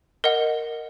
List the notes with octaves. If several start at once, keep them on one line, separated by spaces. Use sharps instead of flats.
A#4 D#5 F#5